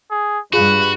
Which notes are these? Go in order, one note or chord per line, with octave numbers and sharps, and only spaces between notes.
G#4
G2 F4 F#4 G#4 B4